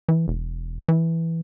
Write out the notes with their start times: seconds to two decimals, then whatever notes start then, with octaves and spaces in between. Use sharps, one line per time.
0.09 E3
0.28 E1
0.88 E3